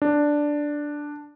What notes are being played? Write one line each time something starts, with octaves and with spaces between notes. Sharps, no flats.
D4